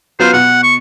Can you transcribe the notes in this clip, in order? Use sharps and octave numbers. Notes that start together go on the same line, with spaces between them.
F#3 B3 F4 C5
B2 F#5
C#6